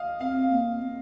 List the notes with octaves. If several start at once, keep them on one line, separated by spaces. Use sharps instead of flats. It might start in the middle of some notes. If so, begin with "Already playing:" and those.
Already playing: D#5 F5
C4 F5
A#3
C4